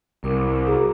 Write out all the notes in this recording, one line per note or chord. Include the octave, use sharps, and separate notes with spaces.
C2 A#4 D6
F#4 G#4 A#5 D6